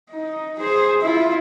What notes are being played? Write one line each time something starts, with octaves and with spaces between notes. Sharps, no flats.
D#4
G#4 C5
E4 F4